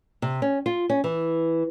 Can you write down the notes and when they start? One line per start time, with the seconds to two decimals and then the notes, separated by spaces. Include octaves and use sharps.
0.22 C3
0.42 C#4
0.66 F4
0.90 C#4
1.04 E3